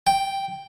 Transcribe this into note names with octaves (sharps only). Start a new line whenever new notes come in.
G5